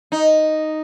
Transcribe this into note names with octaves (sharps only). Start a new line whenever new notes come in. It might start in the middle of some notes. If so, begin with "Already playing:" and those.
D#4